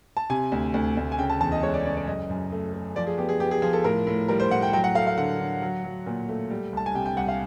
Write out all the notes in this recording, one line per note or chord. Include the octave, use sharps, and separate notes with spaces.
A5
C3 G#5
D2
D2
D2
G#5
C#3 G5
A5
E2 A5
D#5
G#3 C#5
D5
C#3 D5
D5
F#2 D#5
F#2
A3
A3
F3 D5
G#4
B3 G4
G#4
B3 G4
G#4
F3 G#4
A4
A2 A#4
A2
G3 A#4
C5
A2 F#5
G5
F#3 G5
F#5
A3 F5
F5
D3 F#5
D3
F#3
F#3
A#2
A3
G3
C2 A5
G#5
C3 G5
G5
C2 F#5
F5